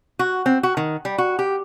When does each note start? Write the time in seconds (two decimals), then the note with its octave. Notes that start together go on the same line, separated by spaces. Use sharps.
0.19 F#4
0.46 C4
0.63 F#4
0.77 D#3
1.05 G3
1.18 F#4
1.39 G4